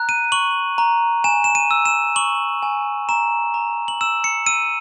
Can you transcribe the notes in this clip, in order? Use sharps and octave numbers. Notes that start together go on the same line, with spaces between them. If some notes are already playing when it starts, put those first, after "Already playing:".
Already playing: A#5 F#6
D#7
C#6 F#7
A#5
G#5 E7
E7
D#7
E6
E7
C#6 F#7
G#5
A#5 E7
A#5
F#7
E6 E7
C#7
E6 D#7